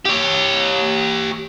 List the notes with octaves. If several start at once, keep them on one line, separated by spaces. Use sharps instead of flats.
G4 C#5